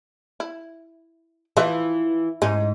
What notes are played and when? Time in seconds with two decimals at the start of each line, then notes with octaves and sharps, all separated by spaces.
0.40 E4
1.57 E3 F3 B4 E5
2.42 G#2 G#3 C#4 D#4